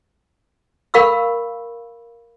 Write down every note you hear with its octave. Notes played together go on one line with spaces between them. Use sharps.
A#4 F5 B5 C#6 E6